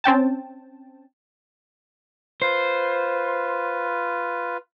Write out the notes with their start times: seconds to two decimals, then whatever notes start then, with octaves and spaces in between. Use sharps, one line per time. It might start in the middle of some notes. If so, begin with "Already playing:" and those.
0.04 C4 C#4 G5 A5
2.42 F4 B4 C5